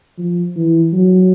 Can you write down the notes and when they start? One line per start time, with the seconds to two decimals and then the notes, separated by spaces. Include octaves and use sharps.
0.18 F3
0.56 E3
0.93 F#3